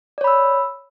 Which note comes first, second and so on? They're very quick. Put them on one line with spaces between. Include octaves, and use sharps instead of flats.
D5 C#5 B5 E6